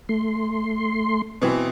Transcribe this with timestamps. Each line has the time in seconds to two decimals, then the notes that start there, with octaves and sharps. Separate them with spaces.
0.09 A3 C6
1.42 B2 E3 C4